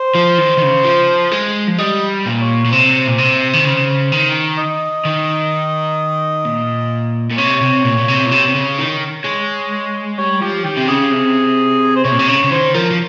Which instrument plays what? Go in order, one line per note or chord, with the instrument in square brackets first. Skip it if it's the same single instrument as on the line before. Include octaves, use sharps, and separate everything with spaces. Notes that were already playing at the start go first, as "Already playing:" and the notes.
Already playing: [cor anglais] C5
[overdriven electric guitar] F3
D#3
D#3
C#3
F3
G#3
F3
[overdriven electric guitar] G3 [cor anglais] D#5
[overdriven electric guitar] A#2
[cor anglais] C#5
[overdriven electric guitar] A#2
[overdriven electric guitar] C3 [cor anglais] C5
[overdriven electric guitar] A#2
C3
D#3
C#3
D#3
[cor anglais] D#5
[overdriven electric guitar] D#3
A#2
A#2
[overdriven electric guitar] C3 [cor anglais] C#5
[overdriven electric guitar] C3
A#2
A#2
C3
A#2
C3
C3
C#3
D#3
[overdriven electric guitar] G#3 [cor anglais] C#5
[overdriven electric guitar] G3 [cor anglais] C#5
[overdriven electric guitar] F3 [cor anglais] G4
[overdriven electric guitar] D#3 [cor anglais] G4
[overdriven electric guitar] C3
[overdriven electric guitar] C#3 [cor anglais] G#4
[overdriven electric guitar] C3
[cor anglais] C5
[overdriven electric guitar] C3 [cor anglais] C#5
[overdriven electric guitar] A#2
C3
[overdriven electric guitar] C#3 [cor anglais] C#5
[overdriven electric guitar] C#3
[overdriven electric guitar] D#3 [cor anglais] C5
[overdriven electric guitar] F3 [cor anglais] A#4
[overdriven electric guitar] F3